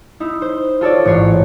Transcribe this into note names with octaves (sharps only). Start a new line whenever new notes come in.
D#4 E4
C5
F4 A4 C#5 D5
A1 G#2 C#5 C7